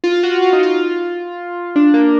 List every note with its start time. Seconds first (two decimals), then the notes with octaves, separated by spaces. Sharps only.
0.04 F4
0.16 F4
0.23 F#4
0.42 F4
0.53 D#4
0.63 F4
1.76 D4
1.94 A#3